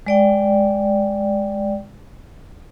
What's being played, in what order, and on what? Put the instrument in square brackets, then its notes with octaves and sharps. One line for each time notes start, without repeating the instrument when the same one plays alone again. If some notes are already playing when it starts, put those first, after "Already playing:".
[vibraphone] G#3 D5 G5